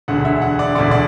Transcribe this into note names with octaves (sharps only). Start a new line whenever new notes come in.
E1 D2 D3 F#5
E5
F#5
D5
E1 D2 D3 D5
D5